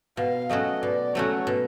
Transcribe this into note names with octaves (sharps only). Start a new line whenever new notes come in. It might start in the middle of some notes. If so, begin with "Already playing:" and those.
B2 F5
F#3 A3 C#4 F#4 D#5
B2 D5
F#3 A3 C#4 F#4 C#5
B2